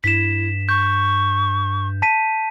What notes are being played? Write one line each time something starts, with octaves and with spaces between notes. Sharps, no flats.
G2 E4 B6 E7
C#6 G6
A5 B6 D#7